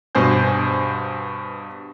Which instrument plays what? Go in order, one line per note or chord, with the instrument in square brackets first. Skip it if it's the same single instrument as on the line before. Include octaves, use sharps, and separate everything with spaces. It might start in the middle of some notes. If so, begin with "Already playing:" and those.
[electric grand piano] G2 B2 C5 G#5 G6